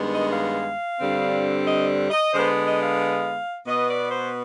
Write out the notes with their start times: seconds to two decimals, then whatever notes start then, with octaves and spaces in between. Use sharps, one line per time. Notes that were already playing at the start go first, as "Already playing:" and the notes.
Already playing: G2 D#3 G#3 B3
0.12 D#5
0.33 F5
1.00 G2 D3 G3 C4
1.67 D#5
2.10 D#5
2.33 D3 G#3 B3 C5
2.66 D#5
2.83 F5
3.66 B2 B3 D#5
3.89 D5
4.11 C5